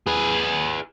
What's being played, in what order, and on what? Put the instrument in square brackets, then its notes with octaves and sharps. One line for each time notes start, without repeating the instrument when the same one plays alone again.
[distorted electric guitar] G#4 B4